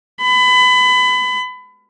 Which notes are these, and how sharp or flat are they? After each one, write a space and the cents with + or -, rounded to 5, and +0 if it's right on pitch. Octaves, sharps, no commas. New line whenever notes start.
B5 +25